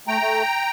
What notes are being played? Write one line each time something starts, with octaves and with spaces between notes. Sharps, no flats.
A3 G5 A#5
A3